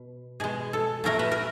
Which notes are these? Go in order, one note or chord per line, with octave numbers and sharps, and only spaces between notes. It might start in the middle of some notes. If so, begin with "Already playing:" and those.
Already playing: B2
B2 G#3 G#4
A4
A#2 F#3 A3 A#4
B4
A#4